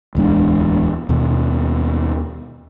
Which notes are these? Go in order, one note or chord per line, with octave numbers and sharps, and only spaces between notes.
D1 E2 G#3 D4
D#2 B2